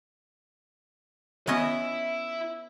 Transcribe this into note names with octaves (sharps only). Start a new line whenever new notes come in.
B3 C#4 E4 D#5 E5